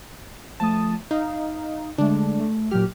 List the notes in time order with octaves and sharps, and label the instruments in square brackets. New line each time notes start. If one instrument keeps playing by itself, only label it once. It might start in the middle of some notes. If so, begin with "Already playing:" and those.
[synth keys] F3 A3 D#6 [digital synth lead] A5
[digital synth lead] D#4 [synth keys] F5
[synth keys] D3 G#3 A3 [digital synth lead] D4
[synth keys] A3
[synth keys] A#2 F#3 G4 [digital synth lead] F6